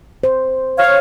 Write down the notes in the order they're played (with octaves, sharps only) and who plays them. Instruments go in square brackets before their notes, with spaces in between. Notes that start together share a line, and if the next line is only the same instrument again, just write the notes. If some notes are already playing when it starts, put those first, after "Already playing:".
[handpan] C5
[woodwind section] C#5 F5